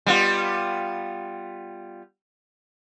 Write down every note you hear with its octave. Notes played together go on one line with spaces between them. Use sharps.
G3 B3 F4